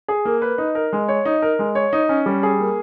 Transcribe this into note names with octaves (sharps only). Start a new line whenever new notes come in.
G#4
A#3
B4
D#4
A#4
G#3
C#5
D#4
A#4
G#3
C#5
D#4
C#4
G3
G#4
A#3